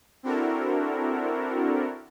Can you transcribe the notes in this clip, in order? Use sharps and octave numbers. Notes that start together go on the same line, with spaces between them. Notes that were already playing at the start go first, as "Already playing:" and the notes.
C4 D4 E4 F#4 A4 A#4